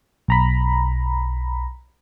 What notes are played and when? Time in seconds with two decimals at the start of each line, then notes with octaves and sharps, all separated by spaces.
0.28 B1 A#5 B5